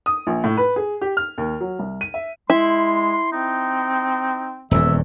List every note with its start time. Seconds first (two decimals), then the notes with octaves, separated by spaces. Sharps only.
0.06 D#6
0.27 A#1
0.44 A2
0.57 B4
0.76 G#4
1.01 G4
1.17 F6
1.38 D#2
1.61 F#3
1.79 C2
2.01 D#7
2.14 E5
2.50 G#3 E4 C6
3.32 C4 D#4
4.71 D#1 E2 E3 E5